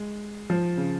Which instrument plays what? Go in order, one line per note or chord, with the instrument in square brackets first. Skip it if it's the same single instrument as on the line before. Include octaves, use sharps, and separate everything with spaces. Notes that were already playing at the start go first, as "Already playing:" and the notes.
Already playing: [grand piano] G#3
F3
C#3